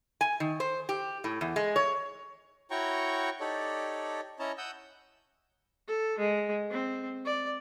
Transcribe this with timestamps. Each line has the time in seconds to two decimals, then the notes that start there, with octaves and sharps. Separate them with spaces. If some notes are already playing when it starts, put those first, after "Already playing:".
0.21 G#5
0.40 D#3
0.60 C5
0.89 G4
1.24 A2
1.41 E2
1.56 G#3
1.76 C#5
2.71 E4 F#4 C#5 G5 A#5 C#6
3.40 D#4 G4 A4 C#5 D5
4.39 C#4 E4 C#5 D#5 A5 A#5
4.58 F#5 D#6 E6 G6
5.87 A4
6.18 G#3
6.70 C4
7.25 D5